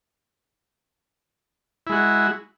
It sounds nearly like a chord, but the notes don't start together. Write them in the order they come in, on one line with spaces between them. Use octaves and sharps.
E4 G#3 F#4